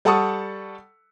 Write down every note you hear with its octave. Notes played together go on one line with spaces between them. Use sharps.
G3 A4 F#5 A5 C#6 D#6